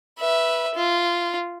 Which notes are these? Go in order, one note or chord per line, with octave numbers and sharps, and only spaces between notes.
B4 E5
F4